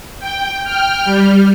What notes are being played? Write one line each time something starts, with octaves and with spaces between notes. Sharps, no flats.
G5
G5 F6
G3